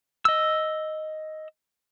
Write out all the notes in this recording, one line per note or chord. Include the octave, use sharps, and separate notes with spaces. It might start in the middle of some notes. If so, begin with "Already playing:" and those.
D#5 E6